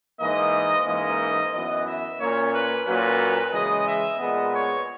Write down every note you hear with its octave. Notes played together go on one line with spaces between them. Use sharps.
G#2 E3 A#3 D#5
G#2 E3 A#3 C#4 D#5
F#2 E3 B3 D#5
E5
A#2 A#3 C#4 C#5
B4
A#2 F#3 A#3 C#4 B4
C#3 E3 G#3 D#5
E5
A#2 G#3 B3 D#5
C#5